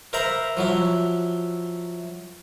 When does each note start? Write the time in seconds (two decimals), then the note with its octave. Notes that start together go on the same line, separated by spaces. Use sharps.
0.13 A#4 C5 E5 F5 A#5 B5
0.57 F3 F#3 E4